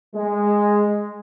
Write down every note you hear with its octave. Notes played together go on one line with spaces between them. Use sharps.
G#3